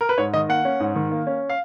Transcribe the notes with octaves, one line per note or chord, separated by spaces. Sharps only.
A#4
B4
G#2 C#5
D#3 D#5
A#3 F#5
C#4
G#2
D#3
A#3
C#4
F5